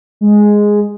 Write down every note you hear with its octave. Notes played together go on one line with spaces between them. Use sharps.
G#3